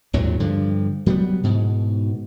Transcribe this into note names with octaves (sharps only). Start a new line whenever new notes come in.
G#1 D#2 A#2 F#3
G2 D3 F3
F#3 G3 A#3 B3
G#2 B2 E3